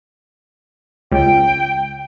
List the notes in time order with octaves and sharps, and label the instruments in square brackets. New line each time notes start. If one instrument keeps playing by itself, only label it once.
[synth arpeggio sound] C#2 [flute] G5